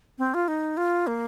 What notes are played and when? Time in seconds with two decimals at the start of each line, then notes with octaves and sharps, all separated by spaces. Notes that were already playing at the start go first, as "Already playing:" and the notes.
0.18 C4
0.34 F4
0.48 D#4
0.77 F4
1.07 A#3